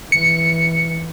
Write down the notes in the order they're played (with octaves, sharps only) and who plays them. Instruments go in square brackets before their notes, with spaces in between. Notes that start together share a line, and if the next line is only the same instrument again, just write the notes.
[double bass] E3 [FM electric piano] C#7